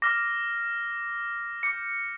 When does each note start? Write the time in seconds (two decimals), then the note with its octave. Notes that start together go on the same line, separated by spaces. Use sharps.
0.02 D6 F6 A#6
1.63 D6 G6 C#7